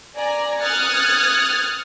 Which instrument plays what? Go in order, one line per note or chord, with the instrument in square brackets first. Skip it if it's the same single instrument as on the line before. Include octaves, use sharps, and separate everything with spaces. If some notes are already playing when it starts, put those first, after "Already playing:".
[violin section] D5 G#5 A#5
D#6 F6 F#6 G#6 A6 C#7